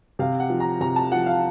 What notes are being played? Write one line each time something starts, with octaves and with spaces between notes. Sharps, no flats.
C3 F5
F#5
F3
A#5
C3 A#5
A5
F3 F#5
F5